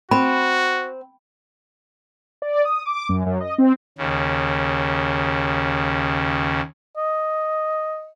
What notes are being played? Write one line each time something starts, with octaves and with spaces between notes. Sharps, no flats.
C4 F#4 B5
D5
D#6
D6
F#2
F#2
D#5
C4
D#2 C#3
D#5